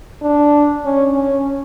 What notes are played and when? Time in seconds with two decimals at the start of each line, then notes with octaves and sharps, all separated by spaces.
0.23 D4
0.85 C#4
1.16 C#4